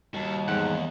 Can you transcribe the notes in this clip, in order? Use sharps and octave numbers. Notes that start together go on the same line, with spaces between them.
D#2 G3 F#4 A5
E2 G#2 F#5